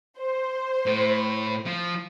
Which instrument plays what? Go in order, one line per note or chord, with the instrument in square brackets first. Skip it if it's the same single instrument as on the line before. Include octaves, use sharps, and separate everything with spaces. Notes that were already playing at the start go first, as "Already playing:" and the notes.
[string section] C5
[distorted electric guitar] A2
F3